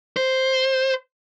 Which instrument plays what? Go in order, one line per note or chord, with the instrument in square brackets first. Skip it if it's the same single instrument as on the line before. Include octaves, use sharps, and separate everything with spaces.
[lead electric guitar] C5